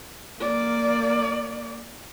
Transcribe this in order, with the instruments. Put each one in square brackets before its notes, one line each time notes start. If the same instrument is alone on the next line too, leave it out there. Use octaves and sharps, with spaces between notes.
[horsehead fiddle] A#3 D5